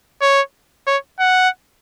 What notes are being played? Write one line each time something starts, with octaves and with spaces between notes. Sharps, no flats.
C#5
C#5
F#5